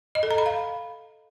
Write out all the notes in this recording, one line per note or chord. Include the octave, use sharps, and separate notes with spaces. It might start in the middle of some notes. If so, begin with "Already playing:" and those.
D#5
A4
A#5
B5
F5